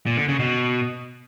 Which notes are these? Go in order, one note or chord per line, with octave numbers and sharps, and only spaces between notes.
A#2
D3
C#3
B2